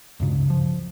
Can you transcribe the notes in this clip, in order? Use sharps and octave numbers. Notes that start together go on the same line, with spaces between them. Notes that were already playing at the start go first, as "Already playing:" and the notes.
C#2 G2 C#3
F3